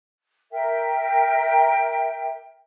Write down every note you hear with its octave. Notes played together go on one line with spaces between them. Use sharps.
A#4 E5 G5